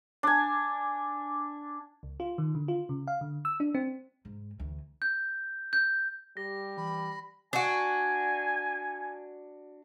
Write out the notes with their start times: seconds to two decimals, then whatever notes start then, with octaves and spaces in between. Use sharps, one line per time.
0.23 D4 G#5
2.03 C#2
2.20 F4
2.38 D#3
2.55 D3
2.68 F4
2.89 C#3
3.07 F5
3.21 D3
3.45 E6
3.60 D4
3.75 C4
4.25 G#2
4.58 D2 E3
5.02 G6
5.73 G6
6.37 G3 G4 A#6
6.77 E3 B5
7.53 D4 F#4 G#5